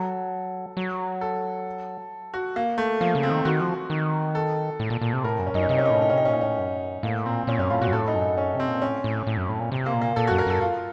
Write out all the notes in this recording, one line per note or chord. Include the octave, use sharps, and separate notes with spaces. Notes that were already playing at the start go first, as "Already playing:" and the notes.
Already playing: F#3 A4
F#3
A4
F#4
A#3
A3
F3 A#3
C#3
C4
D#3
D#3 F#4
F3
D#3
A4
A2
A#2
A#2
C3
A2 A#4
F#2
C#4
F#2 D#4
C#4
C3 D#4
C#4
D#4
A2 C#4
D#4
C#4
C3 D#4
C#4
A#2 D#4
A2 C#4
F#2
A2 A#3
A#2 C4
A#2 C#4
F#2 C#4
A2 F4
A#2 F#4
F#2
A2 A4
D#4
F#2
D#4
C#4
C3
C4
A#2
A2 C#4
A2
A2
F#2
A2
A#2
C3
A#3
A#2
A#3
A#2 A4
F#4
F#2
A#4
F#2 A4
F4